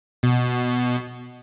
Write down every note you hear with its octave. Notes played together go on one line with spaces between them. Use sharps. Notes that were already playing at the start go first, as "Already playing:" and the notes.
B2